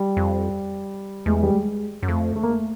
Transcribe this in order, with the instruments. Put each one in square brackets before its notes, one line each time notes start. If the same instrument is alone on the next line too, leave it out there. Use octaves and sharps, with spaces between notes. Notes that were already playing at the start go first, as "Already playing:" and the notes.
Already playing: [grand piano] G3
[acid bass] F2
[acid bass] E2 [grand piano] G#3
[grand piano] G3
G#3
[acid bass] F#2
[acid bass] F2 [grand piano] A3
[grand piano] A3
A#3
A3